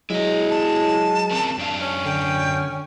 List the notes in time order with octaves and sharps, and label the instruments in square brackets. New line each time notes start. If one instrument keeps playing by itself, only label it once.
[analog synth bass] F#3 [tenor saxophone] G#3 [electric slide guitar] E4 D#5
[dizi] A5
[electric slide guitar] C4 C#4 A#4
F#2 D4 F5
[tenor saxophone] C#4
[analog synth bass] D3 [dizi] G5